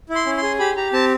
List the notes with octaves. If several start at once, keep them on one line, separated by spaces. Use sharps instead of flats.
E4
C6
C#4
C6
G#4
G4 B5
G4 A#5
C4 A5